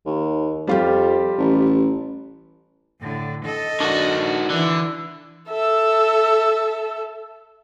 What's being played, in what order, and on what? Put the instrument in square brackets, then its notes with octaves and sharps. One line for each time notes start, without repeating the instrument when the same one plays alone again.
[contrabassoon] D#2
[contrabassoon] F2 [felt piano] G3 F4 G4
[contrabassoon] A1
[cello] A2 D3
A4 D#5
[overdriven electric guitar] D#3 F#4 [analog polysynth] D4
[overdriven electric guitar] D3 [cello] E3 E4
[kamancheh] A4 E5